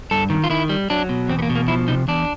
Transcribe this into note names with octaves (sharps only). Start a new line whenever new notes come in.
G2 A4
D#3
F4
D#3 E4
G3
F#3 D4
B2
E2 C4
B3
A#3
B2
A#3
F3 E4
C3 D#4
E2 D4